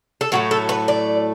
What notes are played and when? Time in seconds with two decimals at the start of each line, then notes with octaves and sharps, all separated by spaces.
0.21 A4
0.32 A2 F#3 A3 F#4
0.51 A4
0.69 B4
0.88 D5